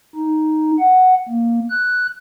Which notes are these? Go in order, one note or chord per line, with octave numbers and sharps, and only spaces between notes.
D#4
F#5
A#3
F#6